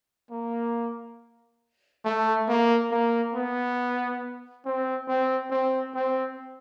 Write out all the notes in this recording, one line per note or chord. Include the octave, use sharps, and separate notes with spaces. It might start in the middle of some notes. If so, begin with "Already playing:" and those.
A#3
A3
A#3
A#3
B3
C4
C4
C4
C4